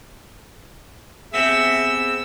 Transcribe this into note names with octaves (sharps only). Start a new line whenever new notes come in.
B3 C4 G4 G#4 E5 E6